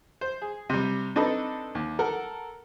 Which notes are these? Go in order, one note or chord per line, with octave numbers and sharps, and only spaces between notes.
C5
G#4
C3 G3
C4 D4 D#4 A4 B4
D#2
A4 A#4 F#5